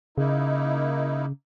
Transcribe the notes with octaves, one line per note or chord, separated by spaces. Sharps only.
C#3 A#3 D#4 E4